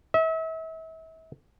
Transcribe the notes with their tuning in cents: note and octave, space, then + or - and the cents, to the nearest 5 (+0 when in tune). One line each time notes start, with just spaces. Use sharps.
E5 -35